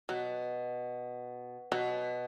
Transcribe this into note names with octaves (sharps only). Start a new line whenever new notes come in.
B2 F#3
B2 F#3